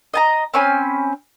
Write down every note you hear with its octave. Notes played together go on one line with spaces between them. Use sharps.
D#5 A5 A#5
C4 C#4 G#5 B5